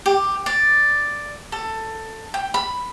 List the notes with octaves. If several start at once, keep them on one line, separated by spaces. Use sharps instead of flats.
G4
D5
A4
G5
B5